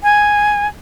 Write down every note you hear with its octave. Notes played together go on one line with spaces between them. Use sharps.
G#5